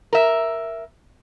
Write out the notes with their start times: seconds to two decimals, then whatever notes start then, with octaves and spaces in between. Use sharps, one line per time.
0.13 A#4 E5